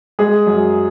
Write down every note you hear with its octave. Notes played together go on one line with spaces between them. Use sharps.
G#3 G#4
F#2